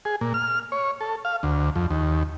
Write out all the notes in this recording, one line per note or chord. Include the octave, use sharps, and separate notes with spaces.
G#4
A#2
F6
C#5
A4
F5
D2
F2
D#2